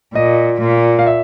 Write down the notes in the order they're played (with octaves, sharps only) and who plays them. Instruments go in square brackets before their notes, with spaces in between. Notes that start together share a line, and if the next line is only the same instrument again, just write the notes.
[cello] A#2 [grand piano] D#5
[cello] A#2
[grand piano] F5
E5